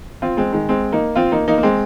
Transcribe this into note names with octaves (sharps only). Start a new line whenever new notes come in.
C4 F4
G#3 C4
D#3 G#3
G#3 C4
A#3 D#4
C4 F4
A#3 D#4
A#3 D#4
A#3
G#3 C4